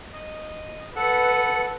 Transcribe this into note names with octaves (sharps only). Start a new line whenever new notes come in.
D#5
A4 B4 F#5